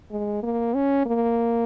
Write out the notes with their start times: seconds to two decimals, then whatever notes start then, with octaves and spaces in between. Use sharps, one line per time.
0.11 G#3
0.43 A#3
0.75 C#4
1.06 A#3